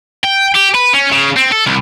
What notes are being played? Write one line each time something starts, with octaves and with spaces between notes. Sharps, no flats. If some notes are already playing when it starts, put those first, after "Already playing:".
G5
G4
B4
C#4
C#3
C4
A4
C2